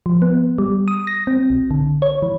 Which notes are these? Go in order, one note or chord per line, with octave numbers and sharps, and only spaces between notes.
F3
B3
G3
D#6
A#6
C4
B1
D3
C#5
E3